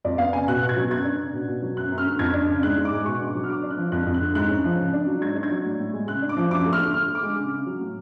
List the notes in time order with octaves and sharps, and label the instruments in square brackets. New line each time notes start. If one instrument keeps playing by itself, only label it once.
[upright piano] F2 D5
B3 F5
C#3 G#5
B2 F#6
B2 F#6
G#6
F#3
F#2 G#6
D4
C#3
B2
B2
F#3
F#2 F#6
F#2
F6
D3
F2 G#6
D4
C#3
G#2 F#6
G#2
D6
G#3
B2 C#6
D4
D6
F#3
F6
D3 D6
D4
F#6
F3
F2 F#6
F2
F#6
D3
G#2 F#6
C#4
F3
C#3
D4
F#3
G#2 G#6
D4
G#6
F#3
A2
A2
G#3
C#3 F#6
D4
D6
F3
F#2 D6
A3
F6
D3
D3 F6
D3
D6
G#3
C#3
C#3
F#3
A2